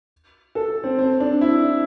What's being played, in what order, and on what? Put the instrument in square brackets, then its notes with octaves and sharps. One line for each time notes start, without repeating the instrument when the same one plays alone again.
[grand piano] A4
C4
C4
D4
E4